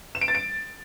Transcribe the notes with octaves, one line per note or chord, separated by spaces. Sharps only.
E7
D7
A6
D7